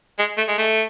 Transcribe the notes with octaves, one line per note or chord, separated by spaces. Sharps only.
G#3
A3
G#3
A3